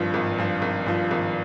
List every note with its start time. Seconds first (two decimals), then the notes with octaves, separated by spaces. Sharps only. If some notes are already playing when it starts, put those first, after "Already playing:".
Already playing: G#1 G2 F3
0.14 G#1
0.38 G2 F3
0.62 G#1
0.86 G2 F3
1.11 G#1